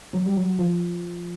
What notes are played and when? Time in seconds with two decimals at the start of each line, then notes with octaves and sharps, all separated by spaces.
0.13 F#3
0.26 G3
0.36 F#3
0.59 F3